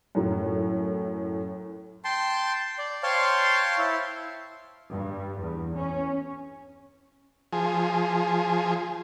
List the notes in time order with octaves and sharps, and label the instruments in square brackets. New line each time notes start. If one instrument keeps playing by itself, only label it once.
[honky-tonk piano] F#2 A2
[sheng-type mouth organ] G5 A5 C6
D5
C5 C#5 F5 G5 A5 C6
E4
[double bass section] G2
E2
C#4
[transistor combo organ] F3 G#4